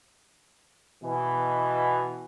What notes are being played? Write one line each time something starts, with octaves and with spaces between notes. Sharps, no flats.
B2 E3